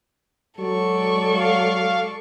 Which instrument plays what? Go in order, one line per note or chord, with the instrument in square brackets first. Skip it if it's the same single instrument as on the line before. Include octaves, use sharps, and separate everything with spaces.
[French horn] F#3 [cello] G#3 D5 [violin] A4 C#6
[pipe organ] F5